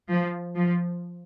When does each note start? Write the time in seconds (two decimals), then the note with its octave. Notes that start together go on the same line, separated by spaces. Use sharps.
0.12 F3
0.56 F3